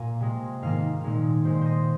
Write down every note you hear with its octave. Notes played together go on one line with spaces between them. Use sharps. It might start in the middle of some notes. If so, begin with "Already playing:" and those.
Already playing: A#2 A#3 F5 G#5
C3 G#3
G#2 D#3 A#3 F5
A#2 G#3
A#2 G#3 C5
C5 D#5